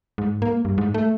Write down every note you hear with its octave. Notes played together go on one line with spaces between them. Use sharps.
G#2
A#3
G2
G#2
A3